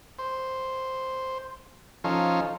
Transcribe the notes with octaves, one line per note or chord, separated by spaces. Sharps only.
C5
F3 C#4 D#4 A4 F5